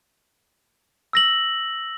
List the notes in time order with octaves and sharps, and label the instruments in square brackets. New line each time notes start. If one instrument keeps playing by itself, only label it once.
[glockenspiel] E6 A#6 F#7